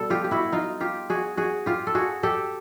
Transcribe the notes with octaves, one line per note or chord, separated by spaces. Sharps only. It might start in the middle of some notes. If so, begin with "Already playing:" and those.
Already playing: B2 G3 A4
F4 G4
G4
E4 F#4
D#4 F4
F4 G4
F#4 G#4
F#4 G#4
F4 G4
A4
F#4 G#4
G4 A4